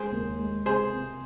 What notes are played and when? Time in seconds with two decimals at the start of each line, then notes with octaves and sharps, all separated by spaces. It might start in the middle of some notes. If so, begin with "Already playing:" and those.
Already playing: G#3 G#4 C5
0.12 D#2
0.39 G#3
0.65 C3 G#4 C5
0.93 C3